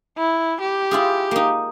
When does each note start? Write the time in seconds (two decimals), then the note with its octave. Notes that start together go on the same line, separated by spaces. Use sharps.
0.18 E4
0.61 G4
0.91 E4 F4 G#4
1.31 A#3 D#4